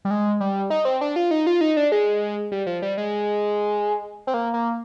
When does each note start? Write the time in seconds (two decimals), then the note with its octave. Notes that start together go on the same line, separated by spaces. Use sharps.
0.05 G3
0.11 G#3
0.40 G3
0.70 D#4
0.85 C4
1.01 D4
1.16 F4
1.31 D#4
1.47 F4
1.61 D#4
1.77 D4
1.92 G#3
2.52 G3
2.66 F3
2.82 G3
2.98 G#3
4.27 C4
4.34 A#3
4.54 A#3